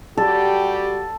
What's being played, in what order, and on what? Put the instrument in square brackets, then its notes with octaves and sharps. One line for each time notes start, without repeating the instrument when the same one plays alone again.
[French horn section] G3 F#4 G4 [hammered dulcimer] A4